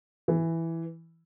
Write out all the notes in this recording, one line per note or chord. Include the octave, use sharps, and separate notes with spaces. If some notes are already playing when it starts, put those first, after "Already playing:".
E3